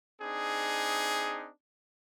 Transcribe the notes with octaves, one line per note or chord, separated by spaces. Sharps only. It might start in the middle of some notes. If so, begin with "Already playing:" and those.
C4 D4 D#4 G#4